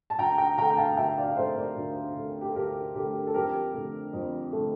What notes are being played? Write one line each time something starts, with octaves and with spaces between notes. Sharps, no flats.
A5
D2 G5 A#5
G5 A#5
D3 A3 G5 A#5
G5
F5 A5
D2 E5 G5
D5 F5
F5
D3 A3 C5 E5
A#4 D5
D2
D3 A3
G4
A4
D2 G4 A#4
D3 A3 G4 A#4
A4
F2 G4 A#4
D3 A3
F2
A3
D3